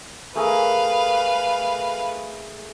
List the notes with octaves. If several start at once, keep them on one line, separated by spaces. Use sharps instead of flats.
A3 G#4 A#4 B4 F5